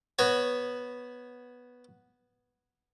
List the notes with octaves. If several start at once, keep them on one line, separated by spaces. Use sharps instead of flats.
B3 F#4 C#5